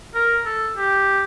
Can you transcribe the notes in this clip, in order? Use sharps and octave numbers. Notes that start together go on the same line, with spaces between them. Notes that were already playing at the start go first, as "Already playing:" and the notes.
A#4
A4
G4